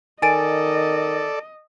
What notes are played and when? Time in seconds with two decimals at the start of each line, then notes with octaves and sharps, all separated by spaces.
0.22 D#3 A4 D5 D#5 G#5 A6 D7